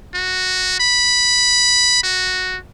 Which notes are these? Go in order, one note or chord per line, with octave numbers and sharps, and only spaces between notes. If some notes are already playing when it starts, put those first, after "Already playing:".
F#4
B5
F#4